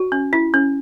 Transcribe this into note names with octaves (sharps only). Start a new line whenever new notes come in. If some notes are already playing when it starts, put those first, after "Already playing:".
Already playing: F#4
C#4
E4
C#4